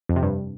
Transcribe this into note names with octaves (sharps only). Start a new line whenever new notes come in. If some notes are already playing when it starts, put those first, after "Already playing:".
F2
C3
G2